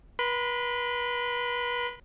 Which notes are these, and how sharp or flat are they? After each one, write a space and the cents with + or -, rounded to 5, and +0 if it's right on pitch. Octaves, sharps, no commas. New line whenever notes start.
B4 -35 B5 +45